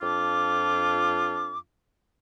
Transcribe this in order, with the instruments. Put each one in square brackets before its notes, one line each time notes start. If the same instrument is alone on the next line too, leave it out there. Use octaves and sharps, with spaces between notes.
[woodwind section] F2 D4 F4 D6